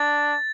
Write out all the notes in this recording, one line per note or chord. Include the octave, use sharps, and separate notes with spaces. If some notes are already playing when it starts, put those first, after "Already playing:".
Already playing: D4 A6